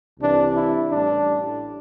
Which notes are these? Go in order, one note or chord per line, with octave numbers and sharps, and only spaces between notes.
C2 C3 E3 D4
E4
A1 A2 G3 D4